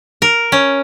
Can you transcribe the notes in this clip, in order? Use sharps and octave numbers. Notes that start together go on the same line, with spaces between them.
A#4
C#4